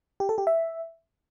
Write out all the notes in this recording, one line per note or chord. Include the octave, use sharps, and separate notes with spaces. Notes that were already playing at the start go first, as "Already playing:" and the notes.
G4
A4
G4
E5